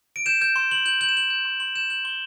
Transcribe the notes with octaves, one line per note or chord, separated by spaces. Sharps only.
D7
G6 E7
G6
C6
C6 F#7
G6 F#7
G6 F#7
E7
G6 F#7
G6
C6
C6 F#7
G6 E7
G6 F#7
C6 G7